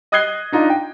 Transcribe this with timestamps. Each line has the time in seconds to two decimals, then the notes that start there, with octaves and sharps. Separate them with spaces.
0.12 D#5 D#6 F#6 G#6 C7 G7
0.52 D4 D#4 F4
0.70 G5